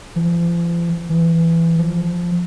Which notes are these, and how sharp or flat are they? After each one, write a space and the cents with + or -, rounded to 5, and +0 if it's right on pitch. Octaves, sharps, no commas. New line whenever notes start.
F3 -40
E3 +15
F3 +0